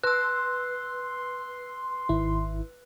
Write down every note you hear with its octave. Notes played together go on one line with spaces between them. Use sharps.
B4 C6 E6 F#6
G#1 D#3 E4